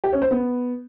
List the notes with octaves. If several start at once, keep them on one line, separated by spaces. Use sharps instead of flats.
G4
C#4
C5
B3